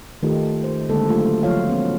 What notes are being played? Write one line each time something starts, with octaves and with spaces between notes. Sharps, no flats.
D#3 A3 D#4 F4 G4 A4
C5
D3 G#3 A#3 C4 A4
F#3 A3 F4 G4
F3 F#3 F4 C5 C#5 F5
B3 C#4